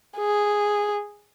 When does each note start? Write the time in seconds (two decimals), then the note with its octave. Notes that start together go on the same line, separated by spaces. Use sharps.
0.18 G#4